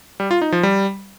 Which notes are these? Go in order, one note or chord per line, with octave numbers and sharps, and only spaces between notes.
G3
F4
D#4
F3
G3